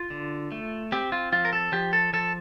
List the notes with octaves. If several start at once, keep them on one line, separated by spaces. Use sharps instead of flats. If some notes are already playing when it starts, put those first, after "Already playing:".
Already playing: F4
D3
A3
C4 G4
F4
F3 F4
A#4
A4
F3 G4
A4
F3 A4